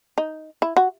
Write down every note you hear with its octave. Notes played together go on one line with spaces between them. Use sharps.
D#4
E4
F#4